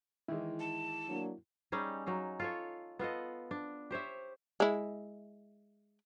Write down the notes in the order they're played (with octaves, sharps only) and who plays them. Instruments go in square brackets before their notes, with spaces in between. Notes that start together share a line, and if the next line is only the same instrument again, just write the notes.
[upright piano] D#3 E3 G#3 [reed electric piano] E4
[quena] A5
[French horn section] F#3 A#3 D4
[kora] G3 C#4 D#4 G#4
F#3 D#4 F5
F4 A4 C#5
B3 F4 A4 D#5
D4
G4 C5 C#5 E5
[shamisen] G#3 E4